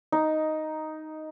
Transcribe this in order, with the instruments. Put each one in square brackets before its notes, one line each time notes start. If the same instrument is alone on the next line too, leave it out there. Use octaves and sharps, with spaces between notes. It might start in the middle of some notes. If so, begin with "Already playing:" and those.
[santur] D#4